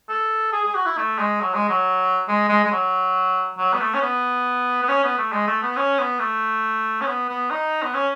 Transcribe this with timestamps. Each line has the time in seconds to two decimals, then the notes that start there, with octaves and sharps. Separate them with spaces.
0.09 A4
0.52 G#4
0.64 G#4
0.75 F#4
0.86 E4
0.97 A3
1.18 G#3
1.40 F#3
1.54 G#3
1.69 F#3
2.28 G#3
2.49 G#3
2.64 G#3
2.72 F#3
3.58 F#3
3.73 B3
3.80 A3
3.94 C#4
4.01 B3
4.83 B3
4.88 C#4
5.03 B3
5.18 A3
5.32 G#3
5.47 A3
5.62 B3
5.77 C#4
5.98 B3
6.19 A3
7.01 C#4
7.06 B3
7.29 B3
7.50 D#4
7.82 B3
7.94 C#4